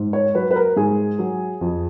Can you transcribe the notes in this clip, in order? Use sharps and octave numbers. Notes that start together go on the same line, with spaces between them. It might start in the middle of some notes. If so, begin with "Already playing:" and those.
Already playing: G#2
C#5
F#3 B4
B4
A#4
G#2 G#4
F#3
F2